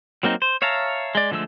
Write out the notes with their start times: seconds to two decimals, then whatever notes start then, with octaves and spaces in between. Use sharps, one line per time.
0.23 F#3 A#3 C4 D#4
0.42 C5
0.62 C#5 E5 F5 A5 A#5
1.15 G#3 D5
1.31 D3 F3 G#3 A3 E6